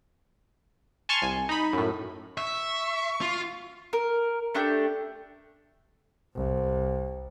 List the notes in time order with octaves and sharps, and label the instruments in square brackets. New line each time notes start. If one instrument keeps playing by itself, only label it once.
[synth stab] G#5 A5 C6 C#6 F6
C2 G#5
D#4 B5
F#2 A2
[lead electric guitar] E5 [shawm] C#6
[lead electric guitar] F4
[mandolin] A#4
A3 D4 G4 G6
[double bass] C2